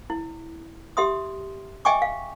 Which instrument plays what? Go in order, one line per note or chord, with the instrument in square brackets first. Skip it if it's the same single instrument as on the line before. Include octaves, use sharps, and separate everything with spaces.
[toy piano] E4
G4 E5 C6 D#6
D#5 E5 G5 G#5 C#6 D6
F5